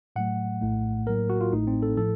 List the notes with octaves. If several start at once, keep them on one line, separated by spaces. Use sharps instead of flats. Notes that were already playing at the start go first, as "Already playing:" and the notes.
A2 F#3 A3 F#5
A#1 A2 A3
A2 F#3 A#3 A#4
F#4
F4
A1 A2 A3 D#4
C4
A4
A2 F3 A4